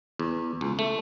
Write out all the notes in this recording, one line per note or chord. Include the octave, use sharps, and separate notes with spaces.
E2
C#2
A3